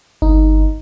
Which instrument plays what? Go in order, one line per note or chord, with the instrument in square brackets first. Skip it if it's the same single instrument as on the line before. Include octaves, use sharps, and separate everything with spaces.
[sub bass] G1 [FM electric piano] D#4